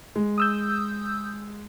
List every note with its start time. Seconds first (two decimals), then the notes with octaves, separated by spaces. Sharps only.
0.16 G#3
0.38 D#6 E6 G6